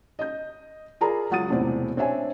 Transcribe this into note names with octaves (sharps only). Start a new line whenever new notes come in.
D#5 G6
F4 G#4 A#4 D5 A#5 B5
C#2 F#3 F#5 D#6 A6 D#7
E1 A2 C3 C4 D5
C4 D4 C#5 E5 G#5